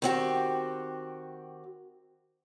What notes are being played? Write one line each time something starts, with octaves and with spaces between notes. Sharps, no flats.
D#3 C4 F#4 G4